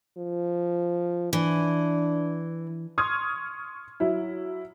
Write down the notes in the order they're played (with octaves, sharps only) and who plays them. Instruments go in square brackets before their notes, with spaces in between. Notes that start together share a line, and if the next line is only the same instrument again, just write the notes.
[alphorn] F3
[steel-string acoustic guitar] E3 [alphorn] D4
[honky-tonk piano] C6 C#6 D#6 F6 G#6
F#3 E4